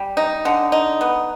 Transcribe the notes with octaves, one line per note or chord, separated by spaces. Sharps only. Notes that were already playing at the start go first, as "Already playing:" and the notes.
Already playing: G3
D#4
D3
D#4
B3